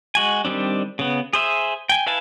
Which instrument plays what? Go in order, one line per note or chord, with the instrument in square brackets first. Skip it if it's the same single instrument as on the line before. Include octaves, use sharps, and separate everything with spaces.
[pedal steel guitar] G#3 F#4 G#5
D#3 G3 C4 D4
C#3 B3
G#4 C5 E5
G5 G#5
E4 B4 F5 G#5 A5